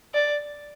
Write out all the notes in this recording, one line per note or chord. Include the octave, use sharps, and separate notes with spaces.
D5